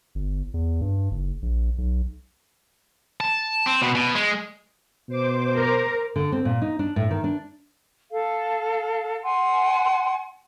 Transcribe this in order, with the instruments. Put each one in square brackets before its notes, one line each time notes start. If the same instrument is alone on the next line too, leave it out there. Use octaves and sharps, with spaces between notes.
[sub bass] G1
E2
G2
F#1
A#1
B1
[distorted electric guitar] A5
C4
B2
B2
G#3
[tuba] B2 [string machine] C5 D6
[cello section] A#4
[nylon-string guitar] D3
C4
A#2
D#4
D4
A2
D#3
D4
[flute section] A4 F5
F#5 G#5 C6